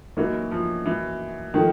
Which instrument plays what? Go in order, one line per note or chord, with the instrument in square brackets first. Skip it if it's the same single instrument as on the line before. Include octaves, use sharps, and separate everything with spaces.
[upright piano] E3 [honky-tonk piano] F#3 A#3 D#4
[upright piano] F3
E3
[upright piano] D#3 [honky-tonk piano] F3 A3